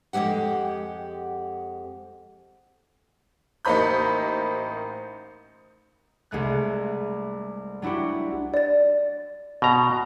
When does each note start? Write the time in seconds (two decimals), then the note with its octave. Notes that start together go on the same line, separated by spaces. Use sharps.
0.13 F2 D#3 G#3 G4 F#5
3.65 A1 A#3 D#4 C5 B5 G6
6.31 C2 G#3 A3 F#6
7.82 F#3 D4 E4 F#4 G4
8.54 D5 A6
9.62 B2 A#5